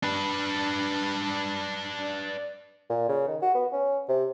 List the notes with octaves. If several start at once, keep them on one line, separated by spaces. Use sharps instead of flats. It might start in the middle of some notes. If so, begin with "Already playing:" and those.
D4 B4
A#2
C#3
D#3
F#4
B3
C#4
C3